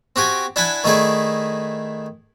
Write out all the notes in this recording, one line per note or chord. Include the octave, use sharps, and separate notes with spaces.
C4 F#4 G4 G#5
D4 E4 F#5 G#5 A5 B5
D#3 A3 D#4 E4 G#4 D5